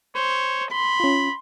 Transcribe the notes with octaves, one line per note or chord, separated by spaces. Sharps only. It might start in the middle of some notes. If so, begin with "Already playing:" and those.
C5 C#5
B5 C6
C#4 F4